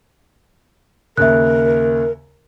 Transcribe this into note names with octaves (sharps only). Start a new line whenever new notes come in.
D#2 C#3 A#4 E5 F#6